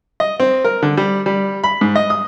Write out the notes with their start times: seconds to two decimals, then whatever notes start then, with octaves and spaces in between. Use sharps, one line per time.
0.20 D#5
0.40 C4
0.64 A#4
0.83 D3
0.97 G3
1.26 G3
1.64 B5
1.81 G#2
1.95 D#5
2.10 D#6